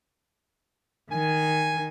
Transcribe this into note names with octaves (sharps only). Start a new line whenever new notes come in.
D#3 G#5